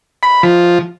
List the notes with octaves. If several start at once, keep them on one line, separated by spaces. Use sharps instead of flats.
B5
F3